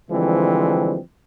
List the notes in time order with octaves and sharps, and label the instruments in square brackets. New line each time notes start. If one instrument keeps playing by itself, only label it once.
[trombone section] D3 E3 F3 G3 G#3 C4